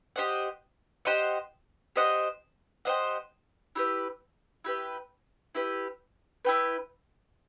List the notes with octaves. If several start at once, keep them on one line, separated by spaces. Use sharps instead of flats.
G4 C5 D#5 F#5
G4 C5 D#5 F#5
G4 C5 D#5 F#5
G4 C5 D#5 F#5
E4 G4 B4
E4 G4 B4
E4 G4 B4
E4 G4 B4